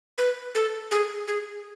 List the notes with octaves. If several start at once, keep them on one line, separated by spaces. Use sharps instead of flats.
B4
A4
G#4
G#4